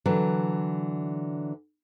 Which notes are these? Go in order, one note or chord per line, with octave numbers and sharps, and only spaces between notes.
D3 E3 F#3